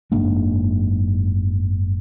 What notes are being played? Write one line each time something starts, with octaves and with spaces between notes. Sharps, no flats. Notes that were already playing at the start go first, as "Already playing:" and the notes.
F#1 G#2 A#3 D4